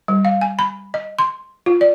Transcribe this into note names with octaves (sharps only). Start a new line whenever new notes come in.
G3
F5
G#5
B5
D#5
C6
F4
D5